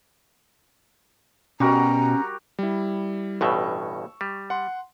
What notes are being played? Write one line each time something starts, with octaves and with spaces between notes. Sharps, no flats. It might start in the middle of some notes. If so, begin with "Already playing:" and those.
B2 G3 C#4 F#4 A#4 A#5
G3 E4
A1 G2 B2 C#6 E6
G3
F#5 C6